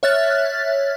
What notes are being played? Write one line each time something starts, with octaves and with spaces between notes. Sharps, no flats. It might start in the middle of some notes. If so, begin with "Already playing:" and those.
C#5 E5 F6 F#6 A6